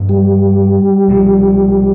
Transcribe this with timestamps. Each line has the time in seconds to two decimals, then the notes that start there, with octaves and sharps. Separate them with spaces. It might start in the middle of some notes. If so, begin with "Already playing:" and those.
Already playing: G2 F3 A#3
0.09 G3
1.08 C2 A#2 F3